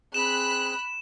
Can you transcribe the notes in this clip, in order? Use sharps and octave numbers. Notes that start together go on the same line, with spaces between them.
C4 G#4 B5 F#6 E7